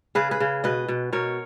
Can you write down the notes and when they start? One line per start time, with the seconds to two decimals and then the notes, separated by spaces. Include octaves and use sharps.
0.15 C#3 G#4 B4
0.31 G#4 B4
0.40 C#3
0.64 B2 B4 D#5
0.88 B2
1.13 B2 A#4 C#5